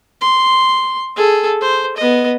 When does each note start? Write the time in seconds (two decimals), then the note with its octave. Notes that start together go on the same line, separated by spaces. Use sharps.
0.21 C6
1.16 G#4 A4
1.61 C5
1.97 B3 D#5